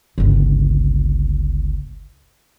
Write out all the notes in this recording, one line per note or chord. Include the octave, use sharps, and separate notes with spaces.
G1 C#2